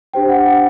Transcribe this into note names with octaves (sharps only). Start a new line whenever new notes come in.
D4 G4 C5 G5
F#5
F#5